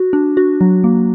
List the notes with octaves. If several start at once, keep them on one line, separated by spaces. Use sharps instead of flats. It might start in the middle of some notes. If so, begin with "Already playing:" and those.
Already playing: F#4
D4
F#4
F#3
A#3